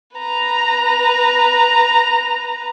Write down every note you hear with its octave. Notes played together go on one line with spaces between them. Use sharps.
B4 A#5